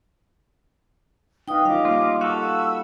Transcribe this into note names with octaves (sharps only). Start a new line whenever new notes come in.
D#4 B4 D#5 F5 G5 D#6
G3 C#4 F4 D#5 F5 D6
A#3 F4
F#4 A4 F5 B5 E6